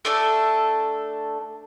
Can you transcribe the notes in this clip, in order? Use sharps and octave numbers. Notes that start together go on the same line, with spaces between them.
A3 D4 A4